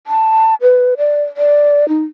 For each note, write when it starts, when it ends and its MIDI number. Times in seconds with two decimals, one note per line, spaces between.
0.07 0.55 81
0.62 0.95 71
0.98 1.23 74
1.37 1.88 74
1.89 2.03 63